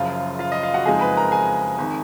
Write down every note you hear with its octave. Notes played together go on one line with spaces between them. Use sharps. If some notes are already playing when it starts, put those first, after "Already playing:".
Already playing: F#1 F#2 C#3 F3 F4 F5
F4 F5
D#5
F4 F5
F#4 F#5
F#1 F2 F3 G#3 D#4 G#4 G#5
B4 B5
A#4 A#5
G#4 G#5
G#1 D#3